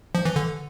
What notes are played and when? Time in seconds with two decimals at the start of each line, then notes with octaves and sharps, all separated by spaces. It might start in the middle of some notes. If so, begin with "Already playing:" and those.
0.15 F3
0.25 E3
0.36 D3